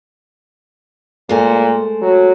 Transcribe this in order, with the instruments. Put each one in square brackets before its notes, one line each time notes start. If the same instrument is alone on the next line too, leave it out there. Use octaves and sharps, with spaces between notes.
[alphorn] A#2 [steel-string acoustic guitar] G#3 A3 C5
[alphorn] F#3